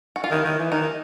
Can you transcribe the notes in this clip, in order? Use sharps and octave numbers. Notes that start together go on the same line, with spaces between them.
F#4
F4
D#3 E4
D#3
E3
D#3 D#4